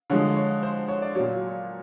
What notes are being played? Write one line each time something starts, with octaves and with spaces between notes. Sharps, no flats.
D3 F3 G#3 C#5
C#5
C5
C#5
D5
A#2 F#3 C#5